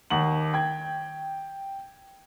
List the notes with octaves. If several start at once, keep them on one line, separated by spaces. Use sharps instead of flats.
D#2 F#5 F#7
G5 G#6